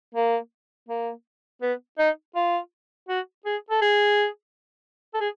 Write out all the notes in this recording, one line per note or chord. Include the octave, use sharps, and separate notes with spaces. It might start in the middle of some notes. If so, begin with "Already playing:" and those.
A#3
A#3
B3
D#4
F4
F#4
G#4
A4
G#4
A4
G#4